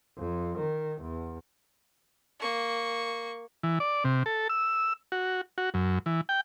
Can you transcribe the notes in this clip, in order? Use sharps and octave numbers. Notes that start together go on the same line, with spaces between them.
F2
D#3
E2
A#3 C#6
E3
D5
C3
A4
E6
F#4
F#4
F#2
E3
G5